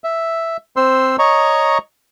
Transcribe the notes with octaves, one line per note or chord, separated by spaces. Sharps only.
E5
C4 C5 C6 E6
C#5 D#5 A#5 C#6